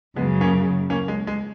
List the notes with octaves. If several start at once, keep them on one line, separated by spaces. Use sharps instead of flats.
F#2 C#3 F#3 G#3 B3
A#3 C#4
A#3 C#4
G#3
G#3